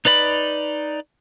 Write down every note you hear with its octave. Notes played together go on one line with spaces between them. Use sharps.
D#4 B4 D5 B5